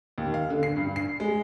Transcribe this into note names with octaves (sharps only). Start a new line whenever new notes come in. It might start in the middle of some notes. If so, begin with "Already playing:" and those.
D#2
F5
D3
C7
G2
C7
G#3